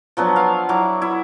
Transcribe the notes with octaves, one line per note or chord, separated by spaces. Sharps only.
F3 F#3 B3 D4
F5
F#3 E4 D6
E4